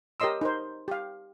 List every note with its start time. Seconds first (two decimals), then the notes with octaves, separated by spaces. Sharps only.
0.20 G4 A#4 C#5 D#5 C6 E6
0.41 D#4 A#4 C5
0.88 G4 F5